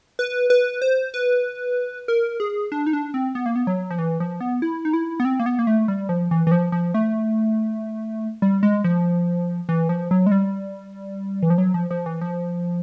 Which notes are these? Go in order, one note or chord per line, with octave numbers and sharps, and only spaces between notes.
B4
B4
C5
B4
A#4
G#4
D4
D#4
D4
C4
B3
A#3
B3
F#3
F3
E3
F3
B3
E4
D#4
E4
B3
C4
A#3
B3
A#3
A3
G3
F3
E3
E3
F3
F3
A3
G3
G#3
F3
E3
F3
F#3
G#3
G3
E3
F3
F#3
F3
F3
E3
F3